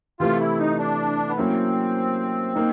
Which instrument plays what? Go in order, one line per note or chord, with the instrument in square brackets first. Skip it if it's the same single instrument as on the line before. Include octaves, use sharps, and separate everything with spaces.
[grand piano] C3 E3 A3 [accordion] F4
[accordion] E4
D#4
D4
B3
[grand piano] F#3 A#3 C#4 E4 [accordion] C4
[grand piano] A#3 D#4